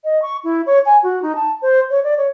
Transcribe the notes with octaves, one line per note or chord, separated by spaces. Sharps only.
D#5
C#6
E4
C#5
G#5
F#4
D#4
A5
C5
C#5
D5
C#5